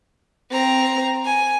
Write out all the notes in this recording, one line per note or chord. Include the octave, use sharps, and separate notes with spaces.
C4 A#5
G#5